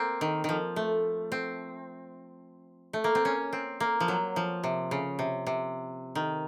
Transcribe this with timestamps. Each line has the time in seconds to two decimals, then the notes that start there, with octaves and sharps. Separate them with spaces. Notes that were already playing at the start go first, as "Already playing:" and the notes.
Already playing: A#3 C4
0.21 D#3
0.44 D#3 F3
0.76 A3
1.32 C4
2.93 A3
3.04 A#3
3.15 C4
3.25 C#4
3.53 C4
3.80 A#3
4.00 F3
4.08 F#3
4.36 F3
4.64 C3
4.91 C#3
5.19 C3
5.47 C3
6.15 D#3